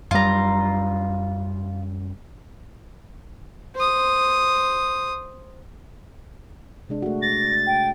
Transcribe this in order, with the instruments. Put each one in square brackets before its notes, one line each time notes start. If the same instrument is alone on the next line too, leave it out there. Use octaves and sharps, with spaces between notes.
[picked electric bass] F#2 G3 [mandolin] F4 A#5
[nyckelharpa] C5 D#6
[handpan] C3 G#3 D4
A3 F#4
[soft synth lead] A6 [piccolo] A#6
[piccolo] G5